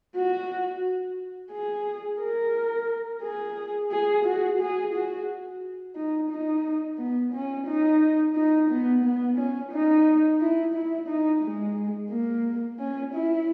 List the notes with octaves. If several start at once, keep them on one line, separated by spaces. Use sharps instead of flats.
F#4
G#4
A#4
G#4
G#4
F#4
G#4
F#4
D#4
D#4
B3
C#4
D#4
D#4
B3
B3
C#4
D#4
E4
E4
D#4
G#3
A#3
C#4
E4